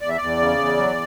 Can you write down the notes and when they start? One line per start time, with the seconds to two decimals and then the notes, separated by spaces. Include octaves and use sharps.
0.01 E2 D5
0.09 E5
0.17 E2 D5
0.39 C#3
0.58 E2
0.77 F#3